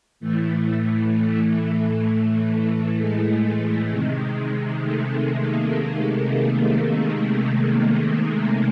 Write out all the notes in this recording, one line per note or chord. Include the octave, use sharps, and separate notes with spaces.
A2 E3 A3
A3
G#3
C3 D#3
A3
A3
A#3